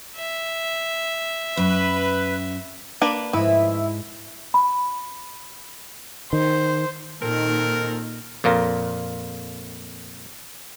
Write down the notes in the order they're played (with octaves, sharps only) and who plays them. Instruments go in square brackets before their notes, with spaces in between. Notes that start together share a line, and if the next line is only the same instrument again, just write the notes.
[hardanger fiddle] E5
[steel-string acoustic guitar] F#2 [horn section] B4
[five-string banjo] A#3 D4 B4
[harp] G#2 G#3 D#5 [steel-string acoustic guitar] F3 A3 E5 [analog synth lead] E4 [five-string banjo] B4
[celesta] B5
[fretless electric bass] D#3 [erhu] C5
[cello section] A#2 D#3 D#4 [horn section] C4 A4 A#4
[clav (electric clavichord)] F2 A#2 F4 A#4